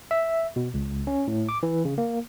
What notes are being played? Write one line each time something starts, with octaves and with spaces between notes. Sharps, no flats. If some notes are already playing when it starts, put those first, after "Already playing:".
E5
B2
C#2
C#4
A2
D6
E3
C#3
A#3